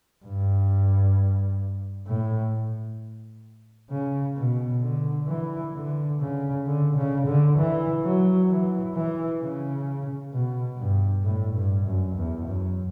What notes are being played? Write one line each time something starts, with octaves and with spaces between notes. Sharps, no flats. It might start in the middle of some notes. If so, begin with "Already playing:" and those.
G2
A2
C#3
B2
D3
E3
D3
C#3
D3
C#3
D3
E3
F#3
E3
E3
C#3
B2
G2
A2
G2
F#2
E2
F#2